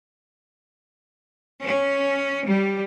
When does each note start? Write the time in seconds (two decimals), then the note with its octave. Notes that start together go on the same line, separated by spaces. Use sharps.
1.64 C#4
2.46 G3